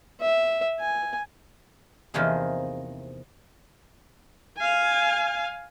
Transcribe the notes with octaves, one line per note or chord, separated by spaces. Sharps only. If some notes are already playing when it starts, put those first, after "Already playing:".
E5
G#5
E2 C3 F3 A#3 D#4 G#4
F5 G#5